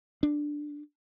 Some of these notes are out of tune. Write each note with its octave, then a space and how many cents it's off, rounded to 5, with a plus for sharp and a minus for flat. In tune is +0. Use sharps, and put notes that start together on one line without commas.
D4 +5